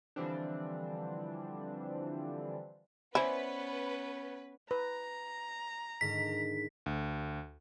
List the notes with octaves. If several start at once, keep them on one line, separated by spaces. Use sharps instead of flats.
D3 E3 F3 G3 C4 D4
B3 C#4 E4 B4 C5 D5 G#5
B4 A#5
G#2 D3 D#3 B6
D2